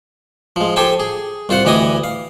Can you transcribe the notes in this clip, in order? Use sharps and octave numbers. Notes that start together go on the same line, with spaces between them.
F3 G#3
G4 A4 C5 G5 G#5
G#4
C2 F4 C5 F#5
D2 E3 G4 D#5 G#5 D#6
F5